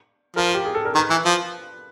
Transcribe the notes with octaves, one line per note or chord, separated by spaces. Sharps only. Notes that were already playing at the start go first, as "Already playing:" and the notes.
F3 A#4
G4
G#4
A4
A#4
D#3 B4
E3
F3